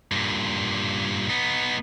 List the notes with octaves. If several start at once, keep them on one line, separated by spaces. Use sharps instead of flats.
G2 A#2
B3 D#4